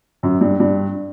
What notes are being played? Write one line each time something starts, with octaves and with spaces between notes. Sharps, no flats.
F#2
G2
G2